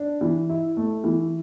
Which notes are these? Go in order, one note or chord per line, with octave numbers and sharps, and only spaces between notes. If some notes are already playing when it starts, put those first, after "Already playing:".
Already playing: D4
E3
E4
A3
E3